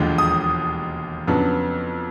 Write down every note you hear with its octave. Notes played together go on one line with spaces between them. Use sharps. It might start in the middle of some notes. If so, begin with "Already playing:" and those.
Already playing: E1 D#2 D3 F3 G#3
D#6
F2 C#3 F#3 B3 D4